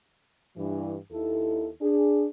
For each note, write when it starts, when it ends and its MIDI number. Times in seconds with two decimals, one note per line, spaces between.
0.56 0.96 43
0.56 0.96 52
1.12 1.69 39
1.12 1.69 64
1.12 1.69 69
1.81 2.25 62
1.81 2.25 68